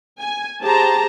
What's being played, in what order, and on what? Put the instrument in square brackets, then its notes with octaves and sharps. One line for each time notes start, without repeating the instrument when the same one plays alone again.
[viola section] G#5
G4 G#4 C5 A5 A#5